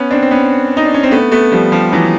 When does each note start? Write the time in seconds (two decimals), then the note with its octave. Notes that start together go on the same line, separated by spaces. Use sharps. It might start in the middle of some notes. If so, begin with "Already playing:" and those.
Already playing: B3 C#4
0.11 C4 D4
0.23 C4
0.31 B3 C#4
0.77 D#4
0.85 D4
0.94 C#4
1.03 C4
1.12 A3 B3
1.32 A3 B3
1.52 F3 G3
1.72 F3 G3
1.92 E3 F#3